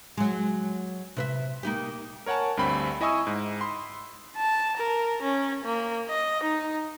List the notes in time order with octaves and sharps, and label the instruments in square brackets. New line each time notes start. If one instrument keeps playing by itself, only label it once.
[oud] F#3 G#3
C3 B4 E5
A#3 D#4 G4
[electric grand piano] A#4 C#5 F#5 G#5 A5
D2 G2 C4 G5 B5
E4 D#5 G#5 C#6 D#6 E6
G#2
B5 C6
[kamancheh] A5
A#4
C#4
A#3
D#5
D#4